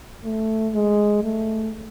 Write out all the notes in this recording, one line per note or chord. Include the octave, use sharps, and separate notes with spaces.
A3
G#3
A3